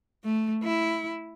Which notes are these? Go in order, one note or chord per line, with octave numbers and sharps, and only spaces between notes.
A3
E4